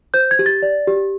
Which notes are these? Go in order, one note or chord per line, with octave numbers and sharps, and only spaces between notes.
C5 G6
G#6
G4
A6
D5
G4